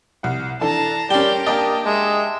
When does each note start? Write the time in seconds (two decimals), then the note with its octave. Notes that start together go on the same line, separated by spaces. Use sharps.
0.23 C2 F#5
0.61 E3 D4 A4 A5 A#5
1.10 G3 C#4 G4 A#4 D5 G5 C6
1.47 A#3 D4 D#5 G5 A5
1.86 G#3 E5